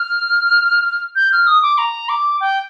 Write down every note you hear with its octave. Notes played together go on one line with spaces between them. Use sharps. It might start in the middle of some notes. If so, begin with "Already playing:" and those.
Already playing: F6
G6
F6
D#6
D6
A#5
D6
G5